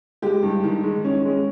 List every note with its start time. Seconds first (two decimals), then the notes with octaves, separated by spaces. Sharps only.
0.22 G#3 G4
0.43 G2
0.64 D#3
0.84 G#3
1.04 C#4
1.25 G#3